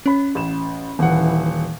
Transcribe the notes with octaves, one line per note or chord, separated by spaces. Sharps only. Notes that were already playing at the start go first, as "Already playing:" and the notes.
C#4 C#5 B5
A1 E7
D#1 E3 F#5